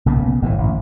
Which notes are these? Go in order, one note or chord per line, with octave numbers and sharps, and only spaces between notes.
B1 C#3 A#3 B3
G1 A2 C3 E3
A1